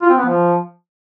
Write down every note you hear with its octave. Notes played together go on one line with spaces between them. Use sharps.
F4
C4
B3
F3